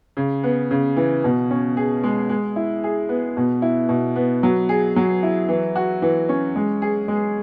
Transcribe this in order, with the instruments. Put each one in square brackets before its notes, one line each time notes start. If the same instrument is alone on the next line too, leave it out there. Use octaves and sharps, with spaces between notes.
[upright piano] C#3
B3
C#3
E3
B2
C#4
G#4
G#3
G#3
E4
G#4
B3
B2
E4
B2
B3
F#3
G#4
F#3
E4
E3
F#4
E3
C#4
G#3
G#4
G#3